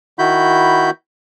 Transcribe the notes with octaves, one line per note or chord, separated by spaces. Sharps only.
D#3 E4 F#4 B5 G6